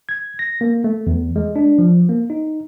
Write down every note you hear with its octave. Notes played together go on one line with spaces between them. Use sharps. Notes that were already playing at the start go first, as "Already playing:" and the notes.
G#6
A#6
A#3
A3
E2
G#3
D4
F3
A#3
D#4